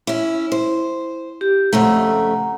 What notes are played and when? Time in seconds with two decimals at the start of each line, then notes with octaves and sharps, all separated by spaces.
0.07 C#4 E4
0.52 C5
1.41 G4
1.73 F2 C#3 A3 F#5 A#5